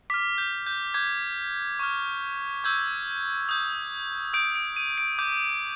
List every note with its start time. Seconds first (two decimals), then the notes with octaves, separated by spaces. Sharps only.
0.10 D6 F6 B6
0.38 G6
0.67 G6
0.94 D6 G6 G#6
1.79 C#6 F6
2.64 C#6 E6 G6 G#6
3.49 D#6 G6
4.33 D#6 G6 D7
4.55 D7
4.76 D#7
4.98 D7
5.18 D6 G6